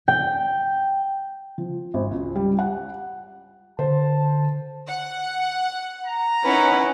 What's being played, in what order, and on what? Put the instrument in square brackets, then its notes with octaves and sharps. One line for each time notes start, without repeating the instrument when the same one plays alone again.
[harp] G5
[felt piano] F3
G#1
C#2
G3
F#5
[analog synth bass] D3 [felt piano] C5 [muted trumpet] A5
[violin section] F#5
[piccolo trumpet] A#5
[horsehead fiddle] C#4 F#5 [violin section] D#4 E4 A#4 [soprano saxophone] B4